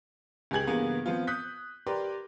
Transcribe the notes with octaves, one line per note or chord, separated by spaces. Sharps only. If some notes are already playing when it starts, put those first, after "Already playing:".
C#2 G4 G#4 G#6 F#7
G2 C#3 E3 A#3 B3
F3 B3 C4 F4
D#6 F#6 G6 B6
G4 A#4 B4 D5 C6